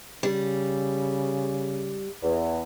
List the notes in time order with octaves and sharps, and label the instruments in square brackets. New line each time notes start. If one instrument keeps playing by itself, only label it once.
[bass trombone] C#3 [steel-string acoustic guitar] G3
[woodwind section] E2